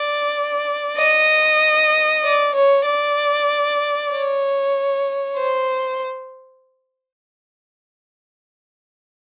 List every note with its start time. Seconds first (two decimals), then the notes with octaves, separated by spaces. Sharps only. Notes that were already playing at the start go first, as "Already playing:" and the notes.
Already playing: D5
0.98 D#5
2.24 D5
2.55 C#5
2.86 D5
4.12 C#5
5.37 C5